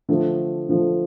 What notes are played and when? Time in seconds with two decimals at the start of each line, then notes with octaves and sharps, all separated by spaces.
0.09 D3 F3 A3
0.69 D3 F3 A3